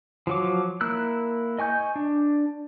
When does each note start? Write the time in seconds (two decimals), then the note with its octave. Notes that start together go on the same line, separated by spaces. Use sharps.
0.27 F3 F#3 D6
0.81 A#3 E4 E6 F#6
1.59 D#5 G#5 C#6 G6
1.96 D4